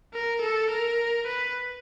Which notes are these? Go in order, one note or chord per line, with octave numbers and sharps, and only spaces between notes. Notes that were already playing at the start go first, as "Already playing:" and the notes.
A#4
A4
A#4
B4